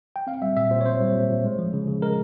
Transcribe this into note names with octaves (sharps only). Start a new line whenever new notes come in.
G5
C4 F5
G3 E5
A#2 E5
A#2 C5
C#5
C4 C5
G3
A#2
A#2
G#3
F3
C#3
C#3
G#3 A#4